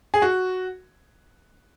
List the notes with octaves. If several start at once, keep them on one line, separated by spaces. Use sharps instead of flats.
G#4
F#4